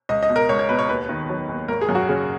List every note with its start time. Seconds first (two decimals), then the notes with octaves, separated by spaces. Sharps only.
0.09 C#2 D#5
0.23 D#5
0.29 B2
0.36 A#4
0.49 C#2 C#5
0.59 C#5
0.69 B2 B4
0.79 C#5
0.89 D#2 B4
1.09 D#3
1.29 F#3
1.49 D#2
1.68 G#1 A#4
1.81 G#4
1.89 F#2
1.95 F#4
2.08 C#3 G#4